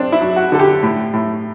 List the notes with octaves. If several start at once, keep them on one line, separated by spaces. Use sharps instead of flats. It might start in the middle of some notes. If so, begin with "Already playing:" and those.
Already playing: C4 D4
E4
F#3
F#4
D3 A4
G4
A2
A2